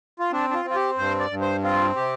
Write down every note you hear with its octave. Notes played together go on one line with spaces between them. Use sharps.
F4
C4 D4
D4
F4
C4
F4
G4
G2 C5
D5
G2
C5
C4 F4
C3 G4